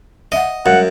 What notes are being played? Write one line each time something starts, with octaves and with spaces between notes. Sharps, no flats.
D#5 E5 F#5
F#2 G3 G#3 F5 F#5